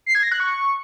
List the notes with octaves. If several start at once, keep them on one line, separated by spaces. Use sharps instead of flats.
C7
G#6
A#6
F#6
C#6